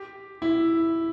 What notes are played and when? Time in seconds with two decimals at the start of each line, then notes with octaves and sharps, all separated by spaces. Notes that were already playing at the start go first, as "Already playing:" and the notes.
Already playing: G4
0.42 E4